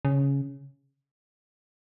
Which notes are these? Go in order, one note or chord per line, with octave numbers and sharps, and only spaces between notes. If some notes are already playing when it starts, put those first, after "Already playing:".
C#3